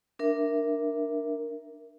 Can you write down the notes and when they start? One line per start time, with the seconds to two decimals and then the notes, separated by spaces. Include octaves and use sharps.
0.19 D4 A#4 E5